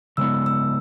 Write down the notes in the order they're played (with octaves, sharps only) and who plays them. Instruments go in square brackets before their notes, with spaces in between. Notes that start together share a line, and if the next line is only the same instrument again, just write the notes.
[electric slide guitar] C#3 G#3 B3 [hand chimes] E6
[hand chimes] E6